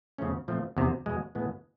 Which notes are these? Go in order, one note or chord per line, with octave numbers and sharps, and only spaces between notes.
E2 C#3 F3 A3 C#4
A#2 F3 A3 C4
E2 C3 D#3
E2 B2 G#3
A2 E3 G#3 B3